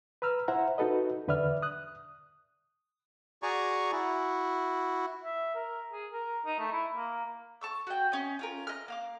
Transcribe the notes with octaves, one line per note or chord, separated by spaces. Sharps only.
B4 A#5 E6 F6
E4 C5 E5 F#5 A#5
D#4 F#4 A4 B4 D#5
E2 D3 B4 D5 E5 F6
D#6 F#6
F#4 G#4 D5 G#5 A#5 C#6
E4 F#4
E5
A#4
G#4
A#4
D#4
A3
E4
A#3
A5 C#6 E6
F#4 G5
C#4 D#5
C#4 F4 A#4
D#5 F6
A#3 F5 D6